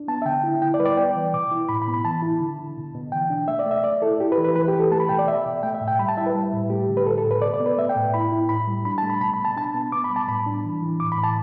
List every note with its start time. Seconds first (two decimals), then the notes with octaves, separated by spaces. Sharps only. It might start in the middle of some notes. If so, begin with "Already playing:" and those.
Already playing: D4
0.08 B3 A5
0.22 E5
0.26 D3 G5
0.43 E4
0.62 E4 G5
0.74 D5
0.79 G3 B4
0.86 D5
0.97 B3 G5
1.16 E3
1.34 B2 D6
1.51 E4
1.69 A2 B5
1.82 B5
1.88 B3
1.94 B5
2.04 E3 A5
2.22 E4
2.40 D3
2.59 D3
2.77 B2
2.95 B2
3.12 E3 G5
3.30 D4
3.48 A3 E5
3.59 D5
3.66 A3 E5
3.84 A3 D5
4.02 E4 A4
4.20 E4 G4
4.32 B4
4.38 E3
4.44 B4
4.55 E3 B4
4.68 G4
4.73 E3
4.80 A4
4.92 A3 A5
5.00 B5
5.09 B2 G5
5.19 D5
5.28 B2 E5
5.46 B2
5.63 A3 G5
5.74 E5
5.81 A2
5.88 G5
5.99 G3 B5
6.08 A5
6.17 E4 E5
6.26 B4
6.35 G3
6.53 A2
6.70 A3 G4
6.89 D3
6.97 B4
7.06 A2 A4
7.18 A4
7.24 A2
7.31 B4
7.42 B2 D5
7.54 D5
7.60 B3
7.66 B4
7.78 A3 E5
7.89 G5
7.96 A2
8.14 E4 B5
8.32 E4
8.49 A2 B5
8.67 G3
8.85 D4 B5
8.98 A5
9.03 A3
9.10 B5
9.21 B2 B5
9.34 B5
9.39 B2
9.45 A5
9.56 D4 A5
9.74 B3
9.92 B3 D6
10.04 B5
10.10 G3
10.16 A5
10.28 A2 B5
10.46 D4
10.65 E3
10.82 E3
11.00 A2 D6
11.12 B5
11.18 A2
11.24 A5